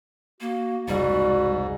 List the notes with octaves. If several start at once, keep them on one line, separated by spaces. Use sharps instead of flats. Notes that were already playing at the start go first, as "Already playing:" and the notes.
A#3 F#4
F1 C#2 G#2 G3 F#4